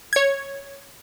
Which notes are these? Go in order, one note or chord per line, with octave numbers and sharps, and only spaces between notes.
C#5 G#6